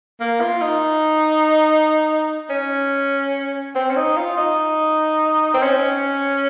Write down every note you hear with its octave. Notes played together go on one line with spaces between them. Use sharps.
A#3
F4
D#4
C#4
C4
C#4
D#4
F4
D#4
C4
C#4